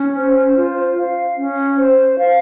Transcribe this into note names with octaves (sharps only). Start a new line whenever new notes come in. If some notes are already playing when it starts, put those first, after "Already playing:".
Already playing: C#4
C5
F4
F5
C#4
C5
F5